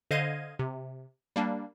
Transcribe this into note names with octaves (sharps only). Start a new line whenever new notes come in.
D3 C5 D#5 F5 G#6 D#7
C3
G3 A#3 D4